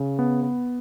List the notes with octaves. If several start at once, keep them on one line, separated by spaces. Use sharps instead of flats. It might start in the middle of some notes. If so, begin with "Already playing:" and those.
Already playing: C#3
B3
B3